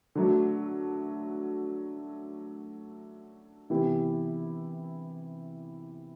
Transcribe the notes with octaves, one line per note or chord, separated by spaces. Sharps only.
D3 F#3 A3
C3 E3 B3 E4 G4